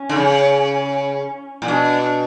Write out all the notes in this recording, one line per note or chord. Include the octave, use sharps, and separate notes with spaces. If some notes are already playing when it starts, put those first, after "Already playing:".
Already playing: C#4
D3
C#3
A#2
B2 D4